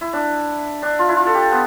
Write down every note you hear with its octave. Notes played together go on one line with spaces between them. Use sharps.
E4
D4
D4
F4
E4
F4
A4
G4
B3